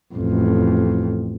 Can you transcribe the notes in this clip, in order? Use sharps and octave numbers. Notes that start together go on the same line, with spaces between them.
A1 F2